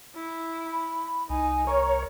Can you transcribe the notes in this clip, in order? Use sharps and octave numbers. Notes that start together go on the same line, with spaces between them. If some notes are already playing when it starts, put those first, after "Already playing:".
E4
B5
C2 D#4 G#5
A#4 C#5 A#5